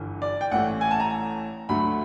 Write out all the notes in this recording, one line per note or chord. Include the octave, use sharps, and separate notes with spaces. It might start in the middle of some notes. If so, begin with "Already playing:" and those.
Already playing: G1 G2 E3
D5
G5
A1 A2 E3 A3 F#5
G#5
A5
A#5
D2 D3 F#3 A3 B5